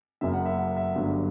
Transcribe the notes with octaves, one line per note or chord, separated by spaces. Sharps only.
F#1 F#2 C#3 E5
F#5
E5
F#5
E5
G1 G2 F#3